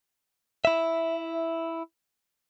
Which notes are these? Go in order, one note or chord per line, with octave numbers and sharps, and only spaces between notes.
E4 E5